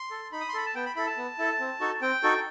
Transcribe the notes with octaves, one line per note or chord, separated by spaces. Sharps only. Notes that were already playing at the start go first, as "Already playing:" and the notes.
Already playing: C6
A4
D#4 B5
D#6
C6
A4 B5
A5
B3 G5
B5
E4 A4 B5
A5
B3
E4 A4
C4
D#4 F#4 A4
C4 G5
D#4 F#4 A4